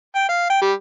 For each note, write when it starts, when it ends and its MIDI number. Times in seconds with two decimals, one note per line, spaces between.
0.15 0.28 79
0.29 0.46 77
0.50 0.60 79
0.62 0.72 55